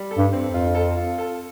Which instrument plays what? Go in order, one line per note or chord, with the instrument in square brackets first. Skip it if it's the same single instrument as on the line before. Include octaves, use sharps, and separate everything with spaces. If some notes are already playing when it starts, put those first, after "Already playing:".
Already playing: [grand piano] G3
A4
[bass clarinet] G2
[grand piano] C4
[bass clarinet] F2
[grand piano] F4
A4
F4
A4